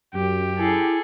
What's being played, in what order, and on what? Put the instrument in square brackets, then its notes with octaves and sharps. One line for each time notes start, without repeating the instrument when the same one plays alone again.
[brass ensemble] F#2 [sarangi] G4
[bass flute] E4 [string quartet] G#4 A4